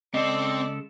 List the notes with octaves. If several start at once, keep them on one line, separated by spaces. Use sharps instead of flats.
C#3 G#3 C4 A4 D5 D#5